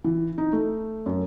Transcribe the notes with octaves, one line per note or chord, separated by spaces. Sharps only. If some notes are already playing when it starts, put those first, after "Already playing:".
E3
D#4
A3
F#2